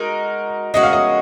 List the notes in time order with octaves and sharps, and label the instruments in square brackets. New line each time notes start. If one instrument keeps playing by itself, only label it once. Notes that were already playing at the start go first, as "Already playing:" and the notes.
Already playing: [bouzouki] G#3 D#4 F#4 [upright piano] A#4
[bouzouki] G#3 C#4 F#4 [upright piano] D#5
[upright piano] F5
D#5